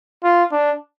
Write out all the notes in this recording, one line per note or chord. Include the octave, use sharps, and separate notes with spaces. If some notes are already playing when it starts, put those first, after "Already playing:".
F4
D4